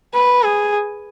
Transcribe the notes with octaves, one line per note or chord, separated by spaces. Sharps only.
B4
G#4